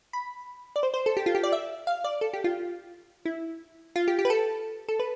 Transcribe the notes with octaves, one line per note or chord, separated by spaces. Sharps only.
B5
D5
C5
C5
A4
G4
F4
G4
D5
E5
F5
D5
A4
G4
F4
E4
F4
G4
G4
B4
A4
A4
B4